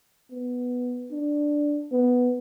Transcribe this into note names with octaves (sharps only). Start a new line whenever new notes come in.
B3
D4
B3